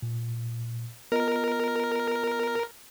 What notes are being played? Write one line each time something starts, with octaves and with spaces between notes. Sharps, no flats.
A#2
B3 F4 A#4 D#5